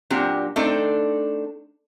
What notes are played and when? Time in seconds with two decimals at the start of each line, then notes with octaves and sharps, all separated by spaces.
0.10 A#2 F#3 C4 D4 G4
0.56 A3 C4 D4 D#4 A4